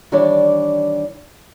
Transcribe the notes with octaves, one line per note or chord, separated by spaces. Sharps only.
D#3 E3 G3 D4 C#5 D5